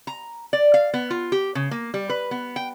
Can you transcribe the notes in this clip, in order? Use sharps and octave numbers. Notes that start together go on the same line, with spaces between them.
A#5
D5
F5
B3
F4
G4
C#3
A#3
G3
B4
B3
G5